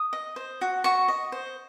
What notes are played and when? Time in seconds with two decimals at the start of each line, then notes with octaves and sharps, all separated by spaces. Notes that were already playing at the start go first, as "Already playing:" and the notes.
Already playing: D#6
0.13 D#5
0.36 C5
0.61 F#4
0.84 F#4 C#6
1.08 D#5
1.32 C5